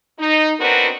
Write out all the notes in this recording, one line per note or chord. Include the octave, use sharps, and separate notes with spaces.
D#4
B3 C4 D4 F#4 A#4 B4